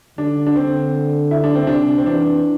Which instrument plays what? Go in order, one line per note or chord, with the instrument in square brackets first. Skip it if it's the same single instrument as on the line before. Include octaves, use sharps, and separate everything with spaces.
[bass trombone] D3 [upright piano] D4
[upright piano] D4
[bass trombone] D3 [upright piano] C4
[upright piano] E4
D4
C4
[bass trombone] C3 [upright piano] D4
[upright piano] C4
[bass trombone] E3 [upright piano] D4